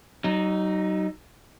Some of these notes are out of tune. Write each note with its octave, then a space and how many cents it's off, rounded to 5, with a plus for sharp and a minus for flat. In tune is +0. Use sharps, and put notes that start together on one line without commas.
F#3 +40 D#4 -5